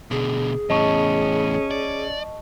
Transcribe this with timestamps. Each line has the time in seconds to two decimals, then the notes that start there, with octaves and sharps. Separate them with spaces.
0.11 B2 D3 G#4
0.70 E2 A2 C#4 D#5 A5 C#6
1.71 D5